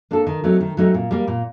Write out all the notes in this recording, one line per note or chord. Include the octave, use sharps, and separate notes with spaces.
A#3 D4 A4
D#3
F#3 A3 C4 D#4
D#3
F#3 A3 C4 D#4
A#2
G3 A#3
A#2